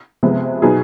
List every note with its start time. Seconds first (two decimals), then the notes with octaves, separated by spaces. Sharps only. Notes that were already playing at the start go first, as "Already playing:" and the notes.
0.23 C3 F3 G#3 B3
0.62 B2 F#3 B3 D#4 G#4